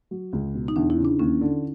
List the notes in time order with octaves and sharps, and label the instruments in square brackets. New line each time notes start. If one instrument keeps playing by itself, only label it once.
[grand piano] F#3
C#2
B2
[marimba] D#4
[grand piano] E2 [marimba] D4
[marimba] E4
[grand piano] C#3
[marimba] D4
[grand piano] D#2 [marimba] C#4
[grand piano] D3